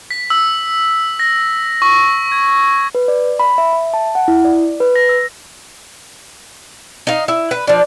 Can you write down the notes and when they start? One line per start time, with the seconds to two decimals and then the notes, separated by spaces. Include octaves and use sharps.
0.11 B6
0.30 E6
1.20 A#6
1.82 C#6
2.32 G#6
2.95 B4
3.08 D5
3.39 B5
3.58 E5
3.73 E5
3.94 A5
4.15 F#5
4.28 E4
4.45 D5
4.80 B4
4.96 A#6
5.09 E6
7.07 D#4 F5
7.28 E4
7.51 B4
7.67 F3 D4